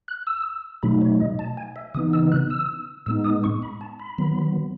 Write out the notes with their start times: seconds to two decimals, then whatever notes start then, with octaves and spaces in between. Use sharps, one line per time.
0.08 F#6
0.27 E6
0.83 B2 F#3 A3 D#4 B5
1.01 C#5
1.20 D#5
1.39 A5
1.57 G#5
1.76 E5
1.94 C#3 E3 B3 D#4 D#6
2.13 E6
2.32 F#6
2.50 E6
3.06 A2 G#3 B3 D#4 E6
3.24 D#6
3.44 C#6
3.62 B5
3.81 A5
3.99 B5
4.18 D#3 F#3 B3